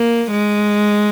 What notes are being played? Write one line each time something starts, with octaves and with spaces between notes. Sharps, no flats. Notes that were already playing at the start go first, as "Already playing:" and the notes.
Already playing: A#3
G#3